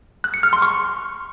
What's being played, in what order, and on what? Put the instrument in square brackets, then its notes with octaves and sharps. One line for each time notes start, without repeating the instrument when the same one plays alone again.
[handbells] F#6
C#7
F6
C6
C#6